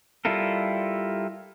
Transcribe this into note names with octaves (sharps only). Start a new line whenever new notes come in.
G3 E4 F4 A4 A#4